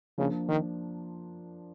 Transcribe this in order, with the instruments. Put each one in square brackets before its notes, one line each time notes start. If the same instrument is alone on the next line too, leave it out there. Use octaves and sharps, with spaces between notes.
[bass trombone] C#3 [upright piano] F3 A#3 D4 F4
[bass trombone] D#3